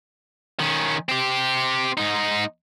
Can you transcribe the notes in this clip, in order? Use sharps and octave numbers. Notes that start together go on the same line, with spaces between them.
D#3 C#4
C4 G4
G#2 D#4